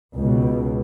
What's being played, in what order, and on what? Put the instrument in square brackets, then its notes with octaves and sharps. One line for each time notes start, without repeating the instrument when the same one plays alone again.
[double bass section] C#2 B2